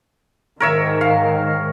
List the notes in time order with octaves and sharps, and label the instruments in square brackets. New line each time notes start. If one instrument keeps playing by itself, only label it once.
[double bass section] G#2 D#3 [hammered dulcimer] A#4 C#5 E5
[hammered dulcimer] F5